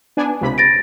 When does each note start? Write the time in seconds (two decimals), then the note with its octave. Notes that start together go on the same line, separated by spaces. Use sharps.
0.17 B3 D4 G#5
0.41 C#2 C3 B5
0.58 A6 A#6 D7